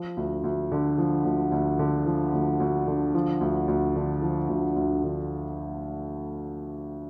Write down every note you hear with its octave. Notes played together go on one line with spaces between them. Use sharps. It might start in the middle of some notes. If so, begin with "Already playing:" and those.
Already playing: F3
D2
D2
D3
F3
D2
D2
D3
F3
D2
D2
D3
F3
D2
D2
D3
F3
D2
D2
D3